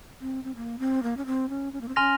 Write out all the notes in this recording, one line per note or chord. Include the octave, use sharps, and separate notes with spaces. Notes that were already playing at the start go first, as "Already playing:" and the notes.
C4
C4
A#3
C4
A#3
C#4
C4
C#4
C#4
A#3
C4
C#4 G#5 C6 F6 A#6 F7